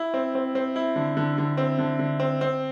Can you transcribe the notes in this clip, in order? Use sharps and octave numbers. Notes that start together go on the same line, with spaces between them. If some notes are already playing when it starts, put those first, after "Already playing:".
Already playing: E4
C4
C4
C4
E4
D3
D3
D3
C4
D3
D3
C4
C4